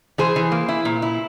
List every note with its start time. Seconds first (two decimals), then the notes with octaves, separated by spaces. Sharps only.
0.18 E3 G#4 C5
0.36 E3
0.52 A#3
0.69 E4
0.85 A#2
1.02 E4